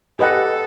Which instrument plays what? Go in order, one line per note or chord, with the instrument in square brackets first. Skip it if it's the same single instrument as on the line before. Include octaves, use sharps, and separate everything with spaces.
[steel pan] G4 B4 D#5 F#5 [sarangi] A4